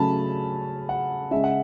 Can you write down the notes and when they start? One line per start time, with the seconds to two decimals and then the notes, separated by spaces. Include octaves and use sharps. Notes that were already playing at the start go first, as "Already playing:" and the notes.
Already playing: C#3 F#3 A3 C#4 A5 B5
0.89 F#5
1.31 C#3 G#3 C#4 E5
1.44 F#5